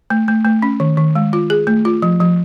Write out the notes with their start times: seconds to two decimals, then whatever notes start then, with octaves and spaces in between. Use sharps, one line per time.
0.10 A3
0.28 A3
0.45 A3
0.62 C#4
0.80 D#3
0.97 D#3
1.15 G#3
1.33 F4
1.50 G#4
1.67 A3
1.85 F4
2.02 F3
2.20 F3